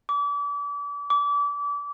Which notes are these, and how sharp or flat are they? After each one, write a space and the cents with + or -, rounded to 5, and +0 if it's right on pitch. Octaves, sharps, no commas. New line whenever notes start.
D6 -35
D6 -30